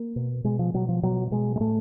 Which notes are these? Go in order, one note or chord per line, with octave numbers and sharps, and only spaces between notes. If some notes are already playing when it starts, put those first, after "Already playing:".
Already playing: A#3
B2
B2 G#3
F3
B2 F#3
F3
B2 F#3
B2 G#3
G#3
A2 A3